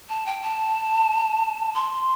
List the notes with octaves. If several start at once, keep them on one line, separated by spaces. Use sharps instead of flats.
A5
G5
A5
C6